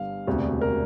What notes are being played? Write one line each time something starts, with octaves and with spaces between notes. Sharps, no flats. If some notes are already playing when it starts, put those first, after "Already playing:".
Already playing: G1 G2 D3 G3 F5
E1 D2 C3
A#4